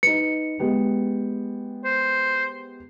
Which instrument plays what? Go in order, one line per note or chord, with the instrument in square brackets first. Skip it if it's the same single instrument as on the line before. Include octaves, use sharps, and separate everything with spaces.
[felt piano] D#4 B4 [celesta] C#7
[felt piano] G#3 B3 G4
[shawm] C5